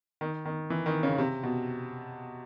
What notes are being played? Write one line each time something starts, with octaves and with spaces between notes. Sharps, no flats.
D#3
D#3
E3
D#3
C#3
C3
B2